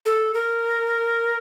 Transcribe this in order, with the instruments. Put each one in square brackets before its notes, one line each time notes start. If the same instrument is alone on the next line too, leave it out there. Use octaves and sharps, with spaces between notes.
[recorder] A4
A#4